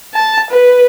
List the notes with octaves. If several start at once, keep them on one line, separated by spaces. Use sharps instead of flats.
A5
B4